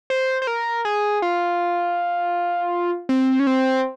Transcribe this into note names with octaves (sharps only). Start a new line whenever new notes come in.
C5
C5
A#4
G#4
F4
C4
C#4
C4